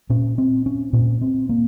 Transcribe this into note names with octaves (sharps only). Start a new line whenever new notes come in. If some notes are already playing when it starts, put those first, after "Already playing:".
A#2 C#4
C4
C#4
A#2 C#4
C4
A#3